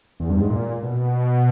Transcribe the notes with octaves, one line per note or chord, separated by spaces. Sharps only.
E2
G2
G#2
A#2
B2